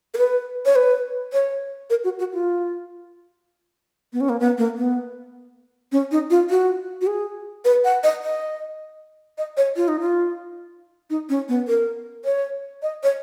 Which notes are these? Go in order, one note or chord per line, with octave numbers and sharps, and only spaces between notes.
A#4
B4
C#5
B4
C#5
A#4
F#4
F#4
F4
B3
C#4
A#3
B3
A#3
B3
C#4
D#4
F4
F#4
F#4
G#4
B4
F#5
D#5
D#5
D#5
C#5
F4
D#4
F4
D#4
C#4
B3
A#4
C#5
D#5
C#5